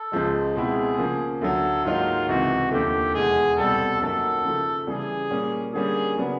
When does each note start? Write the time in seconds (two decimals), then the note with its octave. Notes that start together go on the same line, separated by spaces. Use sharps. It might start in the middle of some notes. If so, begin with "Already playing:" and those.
Already playing: A4
0.12 C#2 C#3 F3 G#3
0.56 B2 G#3 C4 E4 G#4
0.99 C#3 F3 A#3
1.41 D2 D3 F#3 A4
1.85 G#2 D#3 F#3 A#3 D#4 F4
2.28 C#2 C3 E3 F#4
2.72 D#2 D3 F3 A3 G4
3.14 E2 B2 G#3 G#4
3.58 C2 B2 G3 C4 A4
4.01 F#2 D#3 F#3 A#3 A4
4.44 C#3 F3 A3
4.87 C#3 E3 G3 G#4
5.31 A#2 G3 A#3 C#4
5.74 D3 G3 A#3 C#4 G#4
6.18 C#3 F#3 B3 D4